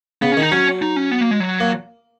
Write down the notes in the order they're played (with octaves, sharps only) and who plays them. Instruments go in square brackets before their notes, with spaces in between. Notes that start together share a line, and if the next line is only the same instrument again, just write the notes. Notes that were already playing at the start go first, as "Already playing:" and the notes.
[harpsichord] C#3 [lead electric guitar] B3
[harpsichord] D#3 [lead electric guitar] C#4
[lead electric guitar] D#4
[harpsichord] F#3 [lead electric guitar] C#4
[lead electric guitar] D#4
C#4
B3
A#3
G#3
F#3
[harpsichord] A#3